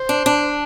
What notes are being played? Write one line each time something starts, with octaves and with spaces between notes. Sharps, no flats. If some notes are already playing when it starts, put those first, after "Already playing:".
Already playing: C5
D4
D4